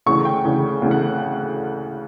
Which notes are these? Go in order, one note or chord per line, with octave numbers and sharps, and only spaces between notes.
D2 C#3 E3 C#6
G5
D2 C#3 E3
D2 C#3 E3
F#5